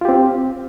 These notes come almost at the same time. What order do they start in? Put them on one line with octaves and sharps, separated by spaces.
F4 G4 C4